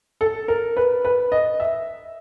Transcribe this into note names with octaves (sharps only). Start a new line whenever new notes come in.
A4
A#4
B4
B4
D#5
E5